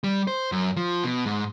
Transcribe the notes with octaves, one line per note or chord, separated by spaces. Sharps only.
G3
C5
F#2
F3
B2
G#2